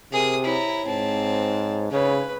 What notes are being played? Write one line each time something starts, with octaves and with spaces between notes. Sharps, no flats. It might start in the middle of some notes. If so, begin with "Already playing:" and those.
C3 G#4 A#4 D#6
E4 C#5 A#5
G#2 C4 A5
C#3 B4 C#5